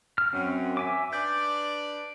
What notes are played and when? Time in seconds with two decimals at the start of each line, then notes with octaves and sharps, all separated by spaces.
0.18 F6
0.33 F#2 C4 C#4
0.77 E5 G#5 D6
1.13 D4 B4 D5 G6